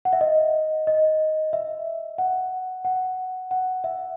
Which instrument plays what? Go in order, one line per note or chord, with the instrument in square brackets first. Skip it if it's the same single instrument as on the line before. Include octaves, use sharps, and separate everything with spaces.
[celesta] F#5
E5
D#5
D#5
E5
F#5
F#5
F#5
E5